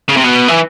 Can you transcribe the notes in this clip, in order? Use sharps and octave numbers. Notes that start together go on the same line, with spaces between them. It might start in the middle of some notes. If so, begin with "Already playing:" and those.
C#3
C3
B2
E3